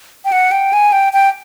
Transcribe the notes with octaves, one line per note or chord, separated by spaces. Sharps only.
G5
F#5
G5
G#5
G5
G5